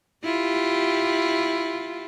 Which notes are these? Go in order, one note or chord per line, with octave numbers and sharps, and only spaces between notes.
E4 F4 G4